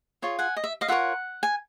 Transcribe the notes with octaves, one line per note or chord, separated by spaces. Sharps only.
F4 G#4 C#5
F#5 G#5
D#5
E5
D#5 F5
F4 A#4 C#5 E5 F#5
G#5